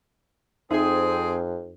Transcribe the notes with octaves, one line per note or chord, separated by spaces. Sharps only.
F2 C4 D#4 G#4 E5